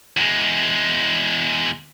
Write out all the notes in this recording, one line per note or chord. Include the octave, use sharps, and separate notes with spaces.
E2 G#3